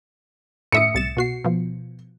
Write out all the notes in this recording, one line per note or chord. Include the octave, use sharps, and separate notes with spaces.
A2 E5 D#6 C#7
C2 A6 E7
B2 F#4 C7
B2 F3